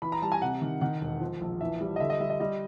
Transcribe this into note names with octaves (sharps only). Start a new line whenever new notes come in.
E3 B5
A#5
G3 A5
G#5
C3 F#5
D#3
D#3 F#5
E1
F3
A#1
E3 E5
G3
D#5
D3 E5
D#5
G3 E5
D#5
G3 D#5